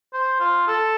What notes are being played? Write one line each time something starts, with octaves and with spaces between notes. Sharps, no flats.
C5
F4
A4